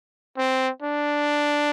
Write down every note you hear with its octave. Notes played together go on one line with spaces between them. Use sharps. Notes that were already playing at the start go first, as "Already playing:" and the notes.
C4
D4